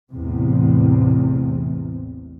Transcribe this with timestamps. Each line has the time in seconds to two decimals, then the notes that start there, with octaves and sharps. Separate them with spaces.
0.11 A1 E2 C3